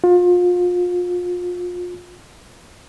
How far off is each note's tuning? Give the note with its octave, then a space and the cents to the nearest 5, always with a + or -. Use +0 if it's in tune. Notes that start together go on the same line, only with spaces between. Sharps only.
F4 +30